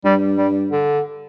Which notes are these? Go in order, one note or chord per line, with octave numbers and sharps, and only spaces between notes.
G2 G3
G3
D3